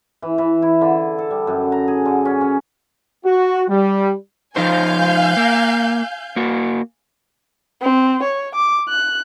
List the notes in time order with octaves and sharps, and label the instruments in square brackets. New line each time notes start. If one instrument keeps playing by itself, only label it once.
[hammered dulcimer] E3
E3
E4
D3
A4
G3
F#2
A#5
G#4
D3
C#4
C#4
[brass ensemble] F#4
G3
[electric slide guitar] F3 D#4 C5 [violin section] F5 G#5 G6
[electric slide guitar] A#3
A#3 F#4
[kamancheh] C4
C#5
D6
F#6